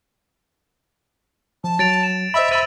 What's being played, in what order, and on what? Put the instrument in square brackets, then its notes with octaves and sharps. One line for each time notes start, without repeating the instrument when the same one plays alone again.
[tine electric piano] F3 [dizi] A5
[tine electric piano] F#3 [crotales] A6 D7 F7
[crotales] E7
[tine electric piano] C5 D#5 B5 [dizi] E5
[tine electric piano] C5 B5 [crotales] E6 A6 D#7